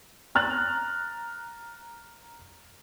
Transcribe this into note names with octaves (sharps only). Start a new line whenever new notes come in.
A#5 F6 F#6 A6